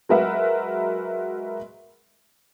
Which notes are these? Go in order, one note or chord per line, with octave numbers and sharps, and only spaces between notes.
F#3 G#3 A#4 B4 E5 F#5